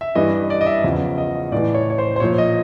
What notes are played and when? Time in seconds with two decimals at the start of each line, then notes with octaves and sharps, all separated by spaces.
0.01 E5
0.15 G2 E3 D#5
0.32 D#5
0.50 D5
0.61 D#5
0.66 E5
0.84 E2 C#3 F3
1.18 D#5
1.52 A2 E3 D5
1.75 C#5
1.90 C#5
1.98 C5
2.16 C5
2.20 A#2 F3 C#5
2.38 D#5